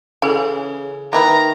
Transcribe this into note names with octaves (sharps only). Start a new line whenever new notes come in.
C#3 E3 C#4 G#4 A4 F5
D#3 A#3 E4 B4 A#5